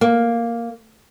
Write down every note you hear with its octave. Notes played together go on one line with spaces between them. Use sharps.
A#3